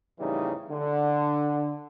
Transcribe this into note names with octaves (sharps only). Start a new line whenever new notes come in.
F2 A2 C#3 E3 G3 D#4
D3